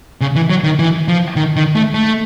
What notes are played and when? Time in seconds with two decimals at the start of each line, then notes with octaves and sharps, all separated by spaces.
0.21 C#3
0.36 E3
0.50 F#3
0.64 D#3
0.79 E3
1.08 F3
1.36 D#3
1.56 D#3
1.75 A3
1.94 A3